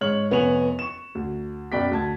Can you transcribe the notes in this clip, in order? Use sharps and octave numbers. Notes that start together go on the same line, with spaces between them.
G#2 C#5 F6 F#7
F1 B3 C#5 G#5 F7 F#7
C#6 E7
D2
F#2 B2 D5 G5 B5 B6
D2 A5 G#6